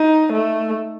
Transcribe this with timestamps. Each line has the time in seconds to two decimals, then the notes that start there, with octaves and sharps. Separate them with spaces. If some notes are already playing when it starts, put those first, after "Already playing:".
Already playing: D#4
0.33 A3